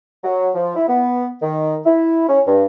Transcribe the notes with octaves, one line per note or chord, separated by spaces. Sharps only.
F#3
F3
E4
B3
D#3
E4
C#4
G2